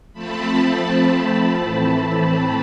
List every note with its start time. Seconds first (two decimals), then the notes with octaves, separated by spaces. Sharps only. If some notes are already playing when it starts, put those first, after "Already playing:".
0.13 F3 A3 C4 A5 B5
0.50 A5 B5
0.86 A5 B5
1.59 A2 E3 A3 C4
2.31 A5 B5